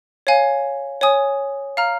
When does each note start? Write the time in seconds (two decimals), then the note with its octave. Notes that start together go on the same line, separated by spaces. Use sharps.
0.27 C#5 F5 G#5
1.01 C#5 G#5 D#6
1.77 F5 A#5 F6